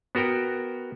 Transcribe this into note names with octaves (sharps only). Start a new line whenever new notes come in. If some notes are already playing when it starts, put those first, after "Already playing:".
B3 F#4 A#4 G5